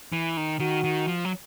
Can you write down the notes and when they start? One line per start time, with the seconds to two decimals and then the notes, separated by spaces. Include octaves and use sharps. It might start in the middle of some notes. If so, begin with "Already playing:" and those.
0.13 E3
0.37 D#3
0.60 D#3 F#4
0.84 D#3
1.08 F3
1.25 F#3